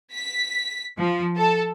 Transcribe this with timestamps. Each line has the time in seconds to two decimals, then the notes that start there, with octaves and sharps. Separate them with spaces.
0.13 B6
0.98 F3
1.37 A4